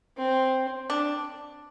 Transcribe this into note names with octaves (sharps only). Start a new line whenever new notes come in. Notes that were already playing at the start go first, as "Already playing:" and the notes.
C4
D4